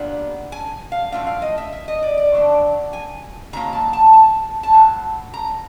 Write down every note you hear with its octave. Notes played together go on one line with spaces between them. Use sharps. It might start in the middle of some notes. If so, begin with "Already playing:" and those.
Already playing: A#2 G3 B3 D4
G#5
F5
A2 F3 A3 D4 F5
F5
D#5
E5
E5
D#5
D5
D5
D3 F#3 A3 D4
G#5
C3 D#3 F#3 A#3 A#5
A5
A5
A5
A5
A2 F#3
A#5